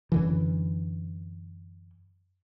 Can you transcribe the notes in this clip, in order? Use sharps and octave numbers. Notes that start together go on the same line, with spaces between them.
F#2 D3 E3